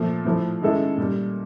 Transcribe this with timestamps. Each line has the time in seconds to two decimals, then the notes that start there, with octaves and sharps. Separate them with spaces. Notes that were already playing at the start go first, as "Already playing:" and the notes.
Already playing: A#2 F3 A3
0.25 A2 F3 A3
0.61 D#3 G#3 C#4 E4 A4
0.97 A#2 G3 A#3